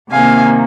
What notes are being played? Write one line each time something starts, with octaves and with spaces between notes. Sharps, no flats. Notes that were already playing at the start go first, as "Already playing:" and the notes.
C3 D#3 A#3 F5 G#5